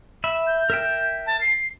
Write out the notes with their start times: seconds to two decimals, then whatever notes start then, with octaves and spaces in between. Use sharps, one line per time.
0.24 E5 B5
0.47 G6
0.70 A#4 E5 G5
1.27 A5
1.41 C7